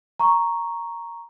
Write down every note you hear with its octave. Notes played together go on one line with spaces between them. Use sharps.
A#5 C#6